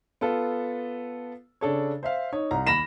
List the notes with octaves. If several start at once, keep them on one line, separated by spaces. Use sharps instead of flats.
B3 F4 A4
C#3 D4 A4 C#5
C5 E5 F5
D#4 C#5
C2 A#5
D#2 B5 A#6 E7